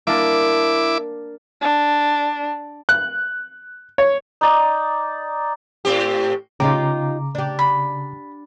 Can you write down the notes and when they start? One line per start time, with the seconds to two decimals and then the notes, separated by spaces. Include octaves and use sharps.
0.07 A#3 D4 E4 D6
1.61 D4
2.89 F#6
3.98 C#5
4.41 D#4 D5
5.85 A2 C4 G4
6.60 C#3 D#4 F4 G4 A#5 D6
7.35 D4 G4
7.59 B5